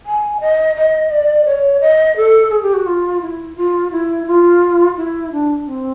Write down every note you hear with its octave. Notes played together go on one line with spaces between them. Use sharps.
G#5
D#5
D#5
D5
C#5
D#5
A4
G#4
G4
F#4
F4
E4
F4
E4
F4
E4
D4
C4